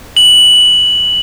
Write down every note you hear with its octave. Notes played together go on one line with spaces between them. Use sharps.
F#7